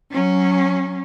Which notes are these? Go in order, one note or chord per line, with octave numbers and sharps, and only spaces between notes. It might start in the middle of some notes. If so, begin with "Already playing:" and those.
F#3 C#4